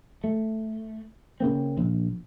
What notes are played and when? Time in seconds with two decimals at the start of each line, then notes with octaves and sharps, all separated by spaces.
0.24 A3
1.40 C#3 A#3 C4
1.77 A#1